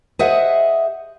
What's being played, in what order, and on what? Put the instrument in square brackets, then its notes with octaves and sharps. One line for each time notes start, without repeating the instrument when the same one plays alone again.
[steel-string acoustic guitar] G#4 C5 D#5 E5 F#5